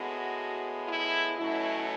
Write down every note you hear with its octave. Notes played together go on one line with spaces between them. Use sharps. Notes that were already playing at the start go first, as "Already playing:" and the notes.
Already playing: A2 G#3 B3 F#4
E4
B2 F#3 A3 C#4 E4